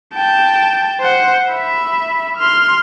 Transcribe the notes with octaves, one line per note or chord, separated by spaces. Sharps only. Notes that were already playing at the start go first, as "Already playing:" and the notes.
G5 A5
C5 F#5
E5 B5
C6 F6